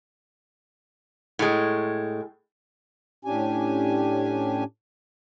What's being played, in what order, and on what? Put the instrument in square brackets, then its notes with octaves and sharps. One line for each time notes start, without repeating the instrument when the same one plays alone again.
[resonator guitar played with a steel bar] A2 G#3
[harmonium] A2 C#4 D4 G4 G#5